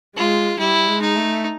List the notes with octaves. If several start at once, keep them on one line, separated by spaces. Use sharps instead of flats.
G#3 F4
G3 E4
G#3
D#4
A3